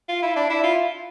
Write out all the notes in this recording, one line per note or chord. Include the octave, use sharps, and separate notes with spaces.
F4
E4
D4
E4
F4